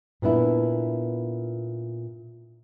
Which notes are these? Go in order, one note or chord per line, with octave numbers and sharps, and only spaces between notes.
A#2 B3 D4 E4